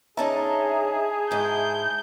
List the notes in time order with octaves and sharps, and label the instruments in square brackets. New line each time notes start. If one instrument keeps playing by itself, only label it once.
[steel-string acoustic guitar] D3 C#4 D#4 [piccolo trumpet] G#4 [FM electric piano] E5 A5 A#5
[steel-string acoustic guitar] G#2 E4 [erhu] G6